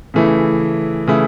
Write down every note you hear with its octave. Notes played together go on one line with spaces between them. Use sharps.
C#3 E3 A3 E4
C#3 E3 A3 E4